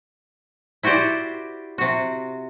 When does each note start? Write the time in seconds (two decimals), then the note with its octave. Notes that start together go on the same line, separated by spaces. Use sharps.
0.83 E4 F#4 G4 C5 D5
1.78 C3 F#4